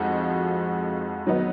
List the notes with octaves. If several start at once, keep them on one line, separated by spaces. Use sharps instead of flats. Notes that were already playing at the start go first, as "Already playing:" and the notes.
Already playing: F2 F3 G#3 D#4 F#4
D#3 F#3 B3 D#4